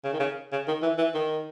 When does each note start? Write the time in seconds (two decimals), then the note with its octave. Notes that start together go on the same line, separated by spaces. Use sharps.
0.04 C#3
0.13 D#3
0.20 C#3
0.52 C#3
0.68 D#3
0.82 E3
0.98 E3
1.14 D#3